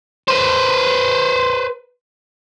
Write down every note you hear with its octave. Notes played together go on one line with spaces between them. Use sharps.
B4 C5